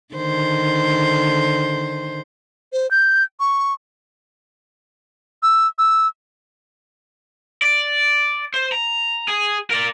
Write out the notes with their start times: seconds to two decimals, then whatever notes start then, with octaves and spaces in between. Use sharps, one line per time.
0.15 D3 D#3 C5
2.73 C5
2.91 G6
3.40 C#6
5.43 E6
5.78 E6
7.62 D5
8.54 C5
8.72 A#5
9.28 G#4
9.70 A#4 D5